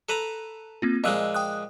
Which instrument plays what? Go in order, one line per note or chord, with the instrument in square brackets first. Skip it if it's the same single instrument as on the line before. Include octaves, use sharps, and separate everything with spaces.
[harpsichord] A4 B4 A#5
[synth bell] A#3 C4 F4
[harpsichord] A#2 F3 G#3 [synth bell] D#5 E6 F#6
[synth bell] G5 D#6 F#6